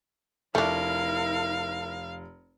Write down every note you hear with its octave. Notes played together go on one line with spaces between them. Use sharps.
F1 A3 D4 E4 A#4 F5